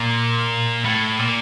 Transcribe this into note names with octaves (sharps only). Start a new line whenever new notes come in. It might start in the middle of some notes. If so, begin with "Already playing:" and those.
Already playing: A#2
A2
A#2